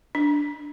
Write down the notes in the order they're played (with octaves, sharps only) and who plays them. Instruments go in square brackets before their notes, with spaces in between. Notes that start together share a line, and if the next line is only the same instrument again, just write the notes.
[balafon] D4